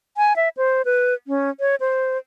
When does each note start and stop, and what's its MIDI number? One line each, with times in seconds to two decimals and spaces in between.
0.17 0.36 80
0.36 0.49 76
0.57 0.82 72
0.85 1.14 71
1.27 1.50 61
1.60 1.76 73
1.80 2.18 72